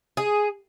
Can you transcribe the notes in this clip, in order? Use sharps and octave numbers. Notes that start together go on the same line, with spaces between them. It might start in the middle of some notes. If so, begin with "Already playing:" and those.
G#4